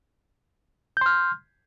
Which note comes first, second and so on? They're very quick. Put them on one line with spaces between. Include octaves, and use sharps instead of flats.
G6 C6 F6